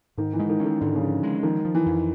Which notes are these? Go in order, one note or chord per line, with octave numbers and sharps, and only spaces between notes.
G#2 D#3
E3
G#3
D#3
C#4
D#3
G#2 D3
C#3
F3
G#3
D#3 F3
F3
E3
F2